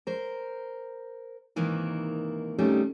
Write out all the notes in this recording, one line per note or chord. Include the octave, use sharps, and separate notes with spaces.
A#4 C5
G#2 C3 D#3 E3 A#3 E4
C3 D#3 G3 A3 C#4